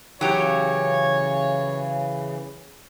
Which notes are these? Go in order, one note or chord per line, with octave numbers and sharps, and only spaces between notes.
C#3 E3 F#3 G4 C#5